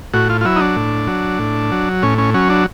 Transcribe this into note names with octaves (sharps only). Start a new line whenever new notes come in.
A2 F#4
F4
F4
F#3 E4
D#4
D4
A2
F#3
A2
F#3
A2 C#4
C#4
F#3 C#4
D4